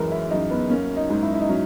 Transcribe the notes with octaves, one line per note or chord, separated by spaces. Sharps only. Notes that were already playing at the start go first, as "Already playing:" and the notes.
Already playing: F#2 E3 G#3 A#4
E4
F#2 D#4
B3
A#3 C#4
D#4
G#2
E4
E4
D#4
F#3 C#4